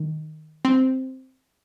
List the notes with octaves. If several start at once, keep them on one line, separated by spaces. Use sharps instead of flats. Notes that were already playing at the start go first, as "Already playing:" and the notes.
Already playing: D#3
C4